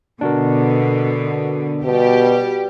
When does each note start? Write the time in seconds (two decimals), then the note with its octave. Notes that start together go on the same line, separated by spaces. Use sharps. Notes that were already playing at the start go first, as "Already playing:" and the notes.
0.21 B2 D3 D4 F#4 A#4
1.84 B2 G3 G4